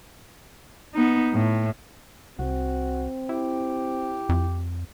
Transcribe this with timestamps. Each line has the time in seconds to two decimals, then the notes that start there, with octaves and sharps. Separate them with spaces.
0.94 B3 D#4
1.33 A2
2.39 C2 C4 F#4
3.29 E4 G4
4.29 F2